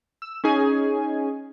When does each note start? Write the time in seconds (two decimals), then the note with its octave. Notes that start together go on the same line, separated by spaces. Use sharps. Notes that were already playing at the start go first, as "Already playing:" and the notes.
0.22 E6
0.44 C#4 D#4 G#4 G#5